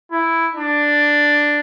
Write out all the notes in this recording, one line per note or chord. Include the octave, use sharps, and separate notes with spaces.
E4
D4